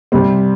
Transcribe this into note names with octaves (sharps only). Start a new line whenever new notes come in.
C3 G3 C4